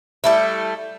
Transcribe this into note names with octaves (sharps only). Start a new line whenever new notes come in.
G3 A3 E4